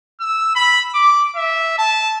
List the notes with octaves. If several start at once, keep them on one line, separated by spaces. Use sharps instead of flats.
E6
B5
D6
E5
A5